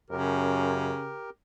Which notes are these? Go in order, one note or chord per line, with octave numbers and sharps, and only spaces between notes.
F#2 C#3 G4 A#4